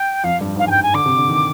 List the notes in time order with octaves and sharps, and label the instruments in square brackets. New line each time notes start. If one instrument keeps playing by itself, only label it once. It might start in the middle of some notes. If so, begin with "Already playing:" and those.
Already playing: [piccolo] G5
[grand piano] F2 [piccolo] F5
[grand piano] G2
[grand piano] G#2 [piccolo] F5
[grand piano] G2 [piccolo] G5 G#5
[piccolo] G#5
[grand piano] D3 [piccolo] D6
[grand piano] C3
D3
D#3